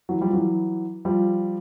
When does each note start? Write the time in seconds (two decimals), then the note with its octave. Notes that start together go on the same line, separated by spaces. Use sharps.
0.09 E3 F#3
0.21 F3 G3
0.33 E3 F#3
1.05 F3 G3